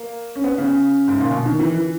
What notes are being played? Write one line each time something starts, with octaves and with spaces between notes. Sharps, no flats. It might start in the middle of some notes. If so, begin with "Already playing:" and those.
Already playing: A#3
C#4
B3
C#3
G#2
A#2
B2
D#3
E3
E3